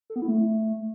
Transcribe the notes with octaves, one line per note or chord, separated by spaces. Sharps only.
A4
B3
E4
A3